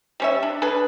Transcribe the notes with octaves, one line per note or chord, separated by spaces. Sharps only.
G3 C#4 E5
D4
D4 G#4 A4 B4